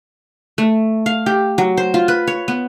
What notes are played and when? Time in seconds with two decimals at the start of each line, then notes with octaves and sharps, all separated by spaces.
0.58 A3
1.06 F5
1.26 G4
1.58 F#3
1.77 C5
1.94 F4
2.08 B4
2.27 C#5
2.48 B3